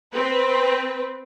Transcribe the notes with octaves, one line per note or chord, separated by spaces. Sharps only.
C4 B4